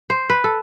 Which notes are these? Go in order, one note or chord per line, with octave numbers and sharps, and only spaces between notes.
C5
B4
A4